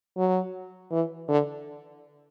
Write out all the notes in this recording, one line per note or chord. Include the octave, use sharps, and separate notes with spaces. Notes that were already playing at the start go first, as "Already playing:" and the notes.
F#3
E3
D3